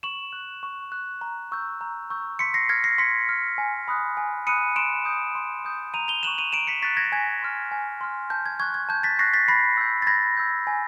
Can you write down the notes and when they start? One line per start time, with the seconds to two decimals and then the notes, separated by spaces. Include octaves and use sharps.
0.03 C#6 E7 F#7
0.33 F#6
0.63 C#6
0.92 F#6
1.21 A#5
1.52 C#6 E6 G6
1.81 A#5
2.10 C#6 E6 G6
2.39 C6 B6 C#7
2.54 A#6 C7
2.69 F6 G#6 A#6
2.84 A#6 C7
2.98 C6 B6 C#7
3.29 F6
3.58 G#5
3.88 B5 D#6 F#6
4.17 G#5
4.47 B5 D#6 F#6 C#7 D#7
4.76 C6 D7 E7
5.05 D#6 G6
5.35 C6
5.65 D#6 G6
5.94 A#5 D#7 F7
6.08 F7 G7
6.23 C#6 F#6 E7 F#7
6.38 D#7 F7
6.52 A#5 D7 E7
6.67 B6 C#7
6.82 C#6 F#6 A6 B6
6.97 G#6 A#6
7.12 G#5 G#6
7.42 C6 F6
7.72 G#5
8.01 C6 F6
8.30 A5 G6
8.46 G#6
8.60 C#6 F#6 G#6
8.74 G#6
8.89 A5 G6
9.03 A6 B6
9.19 C#6 F#6 A#6 C7
9.34 A6 B6
9.48 B5 A#6 C7
9.77 E6 G6
10.02 A6
10.07 B5 G#6 A#6
10.37 E6 G6
10.67 G#5